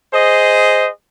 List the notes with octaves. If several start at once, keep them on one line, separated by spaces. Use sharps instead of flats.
G#4 C5 D#5